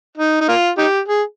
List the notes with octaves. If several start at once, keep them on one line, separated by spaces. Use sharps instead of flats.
D#4
D#4
A#3 F4
D#4 G4
G#4